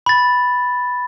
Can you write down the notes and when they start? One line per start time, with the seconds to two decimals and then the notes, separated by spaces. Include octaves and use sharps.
0.06 B5 A6